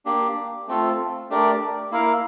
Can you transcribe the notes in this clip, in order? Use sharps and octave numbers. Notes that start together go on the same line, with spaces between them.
A#3 D4 G4
A3 C4 F4 A4
A3 D4 G4 A#4 D5
A#3 E4 A#4 F5